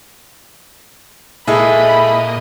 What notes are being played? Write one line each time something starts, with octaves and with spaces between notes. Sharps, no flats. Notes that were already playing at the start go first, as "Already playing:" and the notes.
A#2 G#3 A3 E4 G#4 A4 D#5 B5